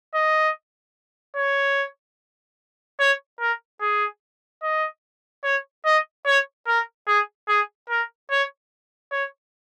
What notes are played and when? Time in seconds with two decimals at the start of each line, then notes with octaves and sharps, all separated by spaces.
0.14 D#5
1.36 C#5
3.00 C#5
3.40 A#4
3.81 G#4
4.62 D#5
5.44 C#5
5.85 D#5
6.26 C#5
6.67 A#4
7.07 G#4
7.48 G#4
7.90 A#4
8.31 C#5
9.12 C#5